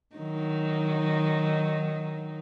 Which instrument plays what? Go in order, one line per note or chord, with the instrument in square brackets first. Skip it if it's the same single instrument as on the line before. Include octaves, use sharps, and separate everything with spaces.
[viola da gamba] D#3 F#3 D#4